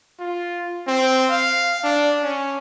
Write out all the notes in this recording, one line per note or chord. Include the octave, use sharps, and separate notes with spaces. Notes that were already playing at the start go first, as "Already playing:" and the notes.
F4
C4
F5
D4
C#4